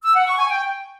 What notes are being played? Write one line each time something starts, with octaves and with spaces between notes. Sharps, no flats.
E6
F#5
C#6
G#5
G5